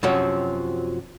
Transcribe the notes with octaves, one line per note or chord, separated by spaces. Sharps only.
F#2 C3 F3 F#3 C4